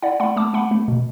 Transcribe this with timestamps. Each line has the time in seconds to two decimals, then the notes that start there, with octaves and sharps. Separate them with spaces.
0.02 E4 D5 F#5
0.20 A3 F#5 B5
0.36 A3 A5 D6
0.54 A3 F#5 B5
0.71 A3
0.88 B2